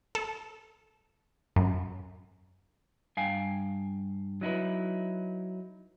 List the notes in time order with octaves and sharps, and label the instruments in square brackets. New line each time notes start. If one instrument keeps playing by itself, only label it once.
[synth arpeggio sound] A4
F#2
[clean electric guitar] G2 F5 G5 G#5
F#3 D#4 E4 B4